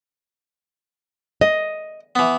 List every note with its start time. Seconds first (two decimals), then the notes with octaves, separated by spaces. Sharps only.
1.41 D#5
2.15 E3 B3